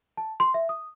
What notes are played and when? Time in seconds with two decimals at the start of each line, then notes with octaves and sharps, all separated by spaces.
0.17 A5
0.40 C6
0.54 E5
0.69 D#6